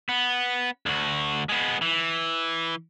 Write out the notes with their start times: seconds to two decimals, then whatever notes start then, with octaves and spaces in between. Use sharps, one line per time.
0.09 B3
0.86 D2 F#4
1.49 G#3 B3
1.82 E3